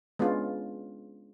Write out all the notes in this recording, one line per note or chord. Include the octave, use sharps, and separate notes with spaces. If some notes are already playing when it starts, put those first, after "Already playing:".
G#3 B3 C#4 D4 F4